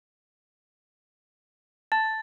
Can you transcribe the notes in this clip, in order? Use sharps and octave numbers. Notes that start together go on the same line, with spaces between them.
A5 A6